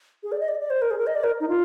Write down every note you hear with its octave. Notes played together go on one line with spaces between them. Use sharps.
G#4
D5
D#5
D5
D5
C5
A#4
G#4
A#4
D#5
D5
A#4
D#4
F4